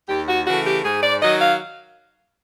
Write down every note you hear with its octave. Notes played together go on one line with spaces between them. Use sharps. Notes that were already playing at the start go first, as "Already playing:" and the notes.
D#2 G4
F#4
C#3 E3 A3 F#4
G4
G#2 G#4
D5
D#3 F#3 D#5
F5